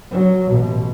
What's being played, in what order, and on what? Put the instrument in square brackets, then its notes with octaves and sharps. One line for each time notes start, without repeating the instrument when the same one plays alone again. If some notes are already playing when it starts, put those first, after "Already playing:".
[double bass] F#3
A1 B2